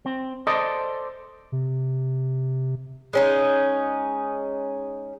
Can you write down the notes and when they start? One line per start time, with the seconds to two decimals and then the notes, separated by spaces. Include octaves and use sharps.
0.06 C4
0.47 A4 C5 D5 D#5
1.52 C3
3.13 G#3 C#4 D#4